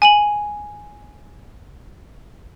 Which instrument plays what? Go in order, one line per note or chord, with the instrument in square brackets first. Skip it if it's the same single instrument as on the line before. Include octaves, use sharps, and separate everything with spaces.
[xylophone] G#5 D#7 F#7